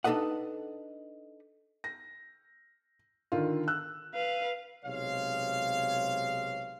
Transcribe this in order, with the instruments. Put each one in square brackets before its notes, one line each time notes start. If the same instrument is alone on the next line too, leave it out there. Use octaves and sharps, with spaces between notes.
[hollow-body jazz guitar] D4 D#4 A4 B4 D#5 F#5
[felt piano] A#6
D3 D#3 F4
E6 F#6
[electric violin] B4 F5
[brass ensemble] B1 C3 G#3 C#5 F5